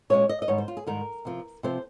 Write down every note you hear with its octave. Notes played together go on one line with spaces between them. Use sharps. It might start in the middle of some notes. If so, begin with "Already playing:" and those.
A#2 G#3 C#4 C#5
D#5
D#5
G#2 D#3 G3 C#5
C5
F4
G#4
G#2 D#3 G3 A#4
C3 F3 C4
C3 F3 C4 C5